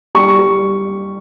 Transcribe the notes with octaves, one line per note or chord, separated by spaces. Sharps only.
G3 C#6
G3